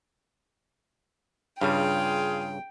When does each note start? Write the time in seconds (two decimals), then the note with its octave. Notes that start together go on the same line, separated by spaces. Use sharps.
1.61 G2 C#3 G3 F4 G#4 G5